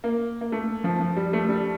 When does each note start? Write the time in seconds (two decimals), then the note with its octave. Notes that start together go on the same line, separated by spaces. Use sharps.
0.04 A#3
0.41 A#3
0.52 A3
0.84 F3
1.00 F3
1.17 G3
1.33 A3
1.49 G3